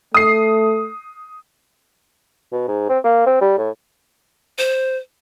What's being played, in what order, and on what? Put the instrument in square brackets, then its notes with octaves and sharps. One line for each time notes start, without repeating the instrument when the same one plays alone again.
[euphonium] A3 [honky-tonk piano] D#6 C7
[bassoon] B2
G#2
C4
A#3
C4
G3
A2
[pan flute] C5